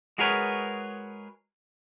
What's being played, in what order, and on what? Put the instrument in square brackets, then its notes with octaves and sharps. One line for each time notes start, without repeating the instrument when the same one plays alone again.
[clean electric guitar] G#3 F#4 G#4 A#4 B4 C#5